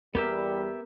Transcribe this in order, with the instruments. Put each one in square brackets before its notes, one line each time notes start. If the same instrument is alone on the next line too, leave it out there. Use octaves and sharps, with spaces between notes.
[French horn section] E2 G3 [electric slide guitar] B3 G4 E5 [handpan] A#4